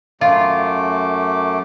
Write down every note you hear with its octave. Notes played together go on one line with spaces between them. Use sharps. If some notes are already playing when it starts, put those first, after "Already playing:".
F#2 A3 F4 D6